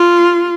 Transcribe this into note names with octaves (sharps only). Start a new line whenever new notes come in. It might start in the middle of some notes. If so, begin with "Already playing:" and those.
Already playing: F4